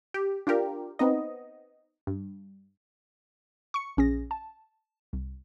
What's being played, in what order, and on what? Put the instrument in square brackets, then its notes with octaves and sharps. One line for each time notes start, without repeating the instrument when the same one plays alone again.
[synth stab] G4
D4 F4 G4 A#4
B3 C4 D#4 D#5
G2
[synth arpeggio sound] C#6 C#7
A#1 C#4 G#4 A#6
A5
C2